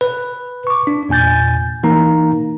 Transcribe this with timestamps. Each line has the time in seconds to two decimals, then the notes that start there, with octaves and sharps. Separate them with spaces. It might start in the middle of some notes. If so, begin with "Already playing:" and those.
0.01 B4
0.67 C#6 D6
0.87 D4
1.09 E2 A#2 G#5 G6 A6
1.83 E3 A#3 D#4 A#5